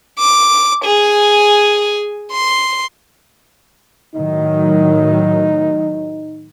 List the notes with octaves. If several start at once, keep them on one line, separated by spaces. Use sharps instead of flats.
D6
G#4 G#5
C6
A2 D#3 F#3 D#4